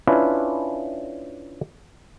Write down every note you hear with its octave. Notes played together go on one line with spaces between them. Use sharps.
C#4 D4 E4 F4 B4